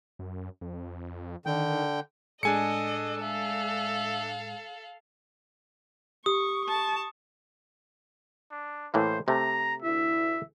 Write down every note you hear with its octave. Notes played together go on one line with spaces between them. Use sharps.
F#2
F2
D3 D#3 G5
A2 G#3 D4 A4 D#5 G#5 C#7
A4 E5 F5
G4 C#6 D#6
A5 C#6
D4
A2 E3 A#3 C5
C3 A3 A#5
D2 E4 E5